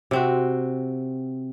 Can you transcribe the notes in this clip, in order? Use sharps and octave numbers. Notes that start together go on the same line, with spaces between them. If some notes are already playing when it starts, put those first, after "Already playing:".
C3 C4 F#4